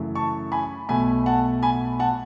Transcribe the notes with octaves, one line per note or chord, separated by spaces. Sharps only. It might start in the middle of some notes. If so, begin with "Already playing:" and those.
Already playing: F#2 C#3 E3 A3
A5 C#6
G#5 B5
B1 B2 A3 G#5 B5
F#5 A5
G#5 B5
F#5 A5